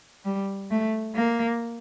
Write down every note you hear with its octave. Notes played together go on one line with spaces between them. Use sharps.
G3
A3
A#3